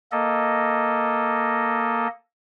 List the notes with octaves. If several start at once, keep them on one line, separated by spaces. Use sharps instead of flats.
A#3 A4 D#5